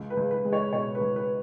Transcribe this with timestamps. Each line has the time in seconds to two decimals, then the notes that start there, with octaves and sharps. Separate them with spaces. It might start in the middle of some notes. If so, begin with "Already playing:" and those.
Already playing: C#2
0.10 B4
0.17 C#2
0.31 B4
0.44 G#3
0.53 C#5
0.73 B2 C#5
0.95 B4
1.01 C#2
1.16 B4